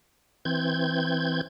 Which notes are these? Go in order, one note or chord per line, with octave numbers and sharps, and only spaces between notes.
E3 C4 G6 G#6